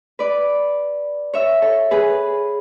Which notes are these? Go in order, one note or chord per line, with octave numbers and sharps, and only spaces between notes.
B4 D5
C#5 E5
A4 C#5
G#4 B4